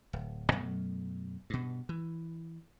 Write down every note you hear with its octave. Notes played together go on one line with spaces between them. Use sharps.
D1
F#2 B2 F#3 A3
G2 B2
E3